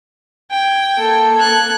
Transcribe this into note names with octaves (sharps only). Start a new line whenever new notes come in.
G5 G#6
A#3 A4
F#6 G#6